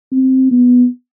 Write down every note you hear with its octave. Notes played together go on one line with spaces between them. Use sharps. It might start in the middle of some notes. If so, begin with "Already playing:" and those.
C4
B3